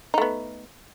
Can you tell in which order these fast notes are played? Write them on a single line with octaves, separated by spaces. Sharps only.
D#4 A3 B3